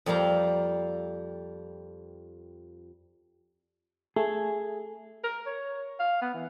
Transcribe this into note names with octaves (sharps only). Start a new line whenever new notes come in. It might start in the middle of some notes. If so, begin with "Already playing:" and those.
F2 G3 A#3 F5 A#5
A3 G#4
A#4
C#5
F5
B3
E3